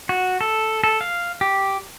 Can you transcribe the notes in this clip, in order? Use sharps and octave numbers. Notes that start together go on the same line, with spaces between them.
F#4
A4
A4
F5
G4